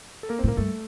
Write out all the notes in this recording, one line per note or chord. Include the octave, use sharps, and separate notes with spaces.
A4
A#3 A#4
C4 C5
A2 A#3 A#4
G2 A3 A4